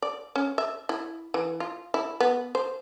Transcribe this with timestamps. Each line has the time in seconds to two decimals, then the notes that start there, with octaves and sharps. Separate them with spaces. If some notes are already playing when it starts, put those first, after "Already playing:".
0.02 D5
0.36 C#4
0.58 E5
0.89 E4
1.34 E3
1.60 F4
1.94 E4
2.20 B3
2.55 C5